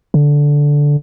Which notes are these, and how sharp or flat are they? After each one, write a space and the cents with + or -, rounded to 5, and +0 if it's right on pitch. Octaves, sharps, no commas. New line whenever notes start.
D3 -10